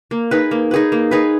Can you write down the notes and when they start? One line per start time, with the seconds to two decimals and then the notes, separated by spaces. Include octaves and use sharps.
0.11 A#3
0.31 D#4 G#4 B4
0.51 A#3
0.71 D#4 G#4 B4
0.92 A#3
1.11 D#4 G#4 B4